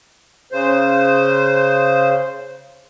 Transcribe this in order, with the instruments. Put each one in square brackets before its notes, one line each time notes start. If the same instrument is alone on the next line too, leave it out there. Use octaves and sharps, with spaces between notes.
[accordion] C#3 C5